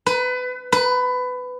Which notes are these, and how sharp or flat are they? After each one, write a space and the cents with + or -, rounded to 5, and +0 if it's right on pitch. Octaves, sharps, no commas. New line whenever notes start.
B4 +25
B4 +20